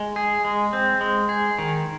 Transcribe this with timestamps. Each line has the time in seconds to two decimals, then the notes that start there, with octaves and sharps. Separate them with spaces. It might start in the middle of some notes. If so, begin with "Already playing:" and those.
Already playing: G#3
0.16 G#4
0.45 G#3
0.73 C4
1.01 G#3
1.29 G#4
1.59 D#3